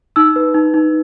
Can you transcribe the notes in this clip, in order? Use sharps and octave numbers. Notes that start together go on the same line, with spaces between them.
D#4 E6
B4
D#4
D#4